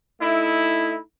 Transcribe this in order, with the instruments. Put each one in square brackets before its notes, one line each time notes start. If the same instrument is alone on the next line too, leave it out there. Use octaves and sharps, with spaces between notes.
[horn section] A3 D#4 E4